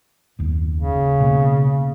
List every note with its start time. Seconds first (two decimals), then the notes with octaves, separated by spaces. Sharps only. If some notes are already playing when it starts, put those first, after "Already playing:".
0.39 F#1 D#2
0.76 C#3
1.20 B2 A#3